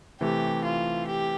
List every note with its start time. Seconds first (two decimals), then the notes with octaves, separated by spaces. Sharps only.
0.21 C3 E3 A3 G4
0.65 F4
1.08 G4